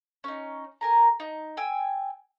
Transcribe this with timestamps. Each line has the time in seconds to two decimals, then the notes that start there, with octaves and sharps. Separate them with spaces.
0.24 C#4 D#4
0.81 A#4 G#5 A#5
1.20 D#4
1.57 G5 G#5 E6